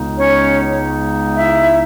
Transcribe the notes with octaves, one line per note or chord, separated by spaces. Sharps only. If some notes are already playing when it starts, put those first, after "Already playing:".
Already playing: C#2 C#3 G#3 B3 D#4
C#4 C#5
E4 E5